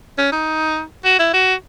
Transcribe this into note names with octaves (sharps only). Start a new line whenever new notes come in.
C#4
D#4
F#4
E4
F#4